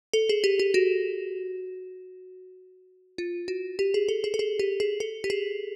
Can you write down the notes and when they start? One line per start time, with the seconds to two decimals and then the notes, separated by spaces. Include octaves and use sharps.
0.13 A4
0.29 G#4
0.44 G4
0.59 G4
0.74 F#4
3.18 F4
3.48 F#4
3.79 G4
3.94 G#4
4.09 A4
4.24 G#4
4.34 A4
4.39 G#4
4.59 G4
4.80 G#4
5.00 A4
5.24 G4
5.30 G#4